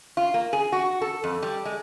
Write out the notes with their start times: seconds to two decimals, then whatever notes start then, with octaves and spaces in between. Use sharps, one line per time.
0.17 F4
0.34 A#3
0.53 G#4
0.72 F#4
1.01 A4
1.24 F2
1.42 G3
1.65 G#3